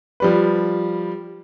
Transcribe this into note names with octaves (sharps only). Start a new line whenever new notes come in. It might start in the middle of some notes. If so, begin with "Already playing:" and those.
F3 G3 B4